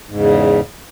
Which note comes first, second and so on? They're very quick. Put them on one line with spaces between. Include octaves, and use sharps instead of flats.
G#2 E2 C#3